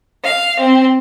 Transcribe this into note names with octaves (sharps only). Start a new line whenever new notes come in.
F5
C4